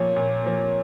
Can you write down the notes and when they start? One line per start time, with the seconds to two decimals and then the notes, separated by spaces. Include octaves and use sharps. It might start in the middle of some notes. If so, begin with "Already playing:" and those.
Already playing: A#2 F3 A#3 C#5
0.16 A#2
0.44 F3 A#3